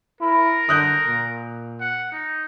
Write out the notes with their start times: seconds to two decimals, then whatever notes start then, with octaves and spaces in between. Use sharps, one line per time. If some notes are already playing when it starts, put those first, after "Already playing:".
0.21 E4 A#4
0.69 D3 D#6 F#6 G6
1.07 A#2
1.81 F#5
2.12 D#4